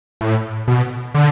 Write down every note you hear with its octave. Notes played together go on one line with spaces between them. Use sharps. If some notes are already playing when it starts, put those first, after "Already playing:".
A2
B2
D3